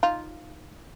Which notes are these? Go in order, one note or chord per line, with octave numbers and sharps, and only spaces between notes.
D#4 F4